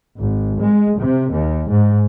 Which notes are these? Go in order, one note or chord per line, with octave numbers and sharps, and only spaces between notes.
G#1
G#3
C3
D#2
G#2